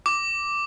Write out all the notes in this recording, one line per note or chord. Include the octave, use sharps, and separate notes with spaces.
D6